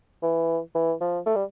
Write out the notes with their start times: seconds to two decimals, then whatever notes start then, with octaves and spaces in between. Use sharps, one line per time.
0.23 E3
0.75 E3
1.01 F3
1.26 A3
1.36 G3